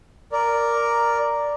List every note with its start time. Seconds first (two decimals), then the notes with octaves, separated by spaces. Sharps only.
0.32 A#4 D5